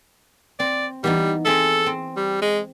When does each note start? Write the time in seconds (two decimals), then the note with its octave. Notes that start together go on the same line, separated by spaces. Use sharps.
0.60 C4 D5
1.04 E3 G3 B3 D#4
1.45 C4 G#4 A4 E5
1.86 C4
2.17 G3
2.42 G#3